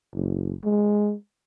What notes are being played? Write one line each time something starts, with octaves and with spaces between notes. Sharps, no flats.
F#1
G#3